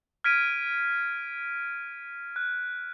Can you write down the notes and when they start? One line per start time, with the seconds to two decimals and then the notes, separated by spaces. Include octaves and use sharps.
0.24 F6 G#6 B6 D7 D#7
2.36 F#6